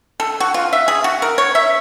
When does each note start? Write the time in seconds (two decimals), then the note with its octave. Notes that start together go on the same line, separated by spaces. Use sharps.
0.20 A4
0.40 F#4
0.54 F4
0.73 E5
0.88 G#4
1.04 F#4
1.22 A#4
1.38 C#5
1.55 E5